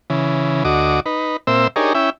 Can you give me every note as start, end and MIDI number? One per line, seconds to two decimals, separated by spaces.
0.10 0.63 49
0.10 0.63 52
0.65 1.00 38
0.65 1.00 66
0.65 1.00 75
0.65 1.00 86
1.06 1.37 63
1.06 1.37 71
1.47 1.67 46
1.47 1.67 60
1.47 1.67 72
1.47 1.67 76
1.47 1.67 88
1.76 1.93 62
1.76 1.93 63
1.76 1.93 67
1.76 1.93 68
1.76 1.93 70
1.76 1.93 73
1.95 2.10 61
1.95 2.10 64
1.95 2.10 76
1.95 2.10 79